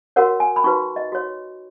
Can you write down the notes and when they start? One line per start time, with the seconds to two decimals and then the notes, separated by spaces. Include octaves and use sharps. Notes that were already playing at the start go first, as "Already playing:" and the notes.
0.16 F#4 A#4 C#5 F#5
0.40 G#5
0.56 B5
0.64 D#4 F#4 B4 C#6
0.96 D#5
1.12 F#4 C#5